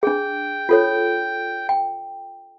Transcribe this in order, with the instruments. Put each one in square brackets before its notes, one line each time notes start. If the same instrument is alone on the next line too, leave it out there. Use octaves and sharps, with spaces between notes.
[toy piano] D4 G#4 [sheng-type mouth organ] G5
[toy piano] F4 A4 C#5
G5